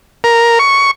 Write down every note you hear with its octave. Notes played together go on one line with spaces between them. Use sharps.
A#4
C#6